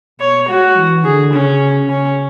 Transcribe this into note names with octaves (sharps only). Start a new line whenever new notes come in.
B2 C#5
G#3 F#4
E3
D3 G#4
C#3 C#4
C#3 C#4